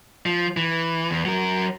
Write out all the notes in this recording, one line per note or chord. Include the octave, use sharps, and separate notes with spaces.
F3
E3
E2
F#3 A#4